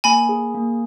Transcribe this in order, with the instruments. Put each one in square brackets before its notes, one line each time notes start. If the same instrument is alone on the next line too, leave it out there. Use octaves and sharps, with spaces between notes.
[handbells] A#3 [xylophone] G#5 B5
[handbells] G#4
A#3